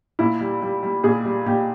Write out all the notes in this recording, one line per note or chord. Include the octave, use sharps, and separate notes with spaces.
A#2 E4
G3
G3
G3
A#2 G#4
G3
A#2 G4